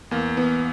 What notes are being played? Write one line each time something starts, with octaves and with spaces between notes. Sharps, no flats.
E2 A#3
E2 B3